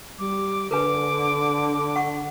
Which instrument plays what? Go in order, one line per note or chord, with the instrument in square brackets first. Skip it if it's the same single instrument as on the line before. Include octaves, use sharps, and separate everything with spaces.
[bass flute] G3 [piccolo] D6
[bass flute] D3 [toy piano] A#4 B4 G#5 [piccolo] D6
[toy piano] F#5 C#6